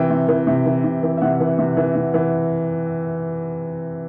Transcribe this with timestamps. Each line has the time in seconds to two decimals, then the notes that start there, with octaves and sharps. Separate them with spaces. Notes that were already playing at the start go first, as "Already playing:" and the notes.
Already playing: C3 E3 G5
0.10 C3
0.29 E3
0.47 C3
0.66 E3
0.84 C3
1.03 E3
1.17 E5
1.22 C3 F#5
1.40 E3
1.59 C3
1.77 E3
1.96 C3
2.14 E3